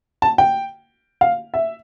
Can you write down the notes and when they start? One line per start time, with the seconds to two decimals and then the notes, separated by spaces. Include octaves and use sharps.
0.22 A5
0.38 G5
1.21 F5
1.54 E5